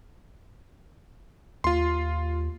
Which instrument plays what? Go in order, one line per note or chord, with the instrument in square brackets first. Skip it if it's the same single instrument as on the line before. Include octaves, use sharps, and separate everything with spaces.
[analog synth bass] D#2 [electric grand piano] F4 C6